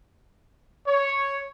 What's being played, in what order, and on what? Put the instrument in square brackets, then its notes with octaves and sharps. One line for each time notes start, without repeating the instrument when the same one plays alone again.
[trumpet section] C#5